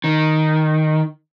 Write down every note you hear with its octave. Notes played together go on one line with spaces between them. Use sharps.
D#3